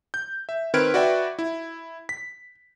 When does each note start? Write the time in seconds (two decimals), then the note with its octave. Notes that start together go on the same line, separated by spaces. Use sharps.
0.14 G6
0.49 E5
0.74 D#3 C4 B4 F6 G#6 D7
0.94 F#4 B4 D5 E5 G5
1.39 E4
2.09 B6